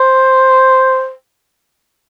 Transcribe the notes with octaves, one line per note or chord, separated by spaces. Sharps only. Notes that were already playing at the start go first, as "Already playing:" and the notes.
Already playing: C5